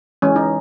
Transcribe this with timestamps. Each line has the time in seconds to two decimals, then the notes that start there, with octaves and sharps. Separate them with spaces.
0.22 E3 G#3 C#4
0.36 D#4